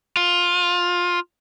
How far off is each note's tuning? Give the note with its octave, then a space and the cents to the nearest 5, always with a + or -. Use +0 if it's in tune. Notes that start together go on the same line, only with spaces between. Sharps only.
F4 +15